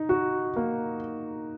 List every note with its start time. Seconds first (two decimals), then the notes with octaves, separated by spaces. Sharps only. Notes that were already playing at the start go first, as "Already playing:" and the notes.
Already playing: D#4
0.09 F#4
0.56 A#3